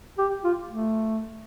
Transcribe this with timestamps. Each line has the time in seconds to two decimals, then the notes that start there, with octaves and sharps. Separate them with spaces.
0.18 G4
0.44 F4
0.69 A3